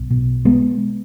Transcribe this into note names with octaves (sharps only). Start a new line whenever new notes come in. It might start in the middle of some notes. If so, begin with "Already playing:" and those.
Already playing: B1
B2
G#3 B3